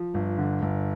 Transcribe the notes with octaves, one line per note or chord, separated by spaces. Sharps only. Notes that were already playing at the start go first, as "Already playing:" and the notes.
Already playing: F3
G1
D3
G1